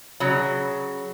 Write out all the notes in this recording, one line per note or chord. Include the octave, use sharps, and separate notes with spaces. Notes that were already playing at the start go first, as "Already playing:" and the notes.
C#3 F#3